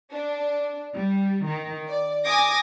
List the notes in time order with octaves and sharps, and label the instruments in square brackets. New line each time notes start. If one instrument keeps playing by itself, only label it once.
[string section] D4
G3
D#3
D5
G#5 D6 D#6 A#6